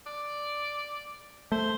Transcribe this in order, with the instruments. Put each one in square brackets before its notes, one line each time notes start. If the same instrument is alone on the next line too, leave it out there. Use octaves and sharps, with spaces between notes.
[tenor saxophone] D5
[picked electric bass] A3 [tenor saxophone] C5